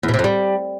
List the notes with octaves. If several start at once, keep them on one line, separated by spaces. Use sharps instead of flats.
E2
B2
C3
F2
G3